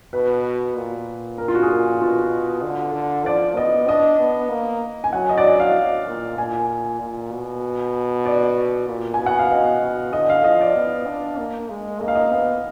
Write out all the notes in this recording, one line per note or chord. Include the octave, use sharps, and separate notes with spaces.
B2 B4
A#2
A#4
F4
F#4
G#4
A#4
B2 F4
D3
D3
F3 D5
B3 D#5
D4 D#5
B3
A#3
G#5
F#3 F#5
D#5
D5
D#5
D#5
F5
A#2
A#2 G#5
A#2
B2
D5
A#2
G#5
B2
F#5
F5
B2 D#5
B2
D3 D#5
F5
F3 D#5
D5
B3
D4
A#3
G#3
A#3 D#5
F5
D#5
B3 F5